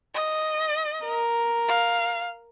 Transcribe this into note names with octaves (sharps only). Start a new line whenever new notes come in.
D#5
A#4
F5